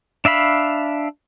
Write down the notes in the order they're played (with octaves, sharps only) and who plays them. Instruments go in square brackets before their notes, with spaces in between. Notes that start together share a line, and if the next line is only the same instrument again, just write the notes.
[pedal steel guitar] D4 E5 F5 B5